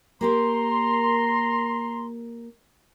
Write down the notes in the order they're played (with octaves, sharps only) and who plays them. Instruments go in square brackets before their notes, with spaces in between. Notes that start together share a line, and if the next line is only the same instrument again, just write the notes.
[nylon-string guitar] A#3 G4 A#4 [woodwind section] A#5 C6